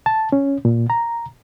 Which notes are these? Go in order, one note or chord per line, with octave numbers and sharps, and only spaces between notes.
A5
C#4
A#2
A#5